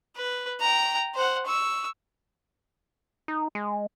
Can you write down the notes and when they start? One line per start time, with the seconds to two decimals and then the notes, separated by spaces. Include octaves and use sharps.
0.16 B4
0.60 G5 A#5
1.15 C5 F#5
1.47 C#6 E6
3.28 D#4
3.55 G#3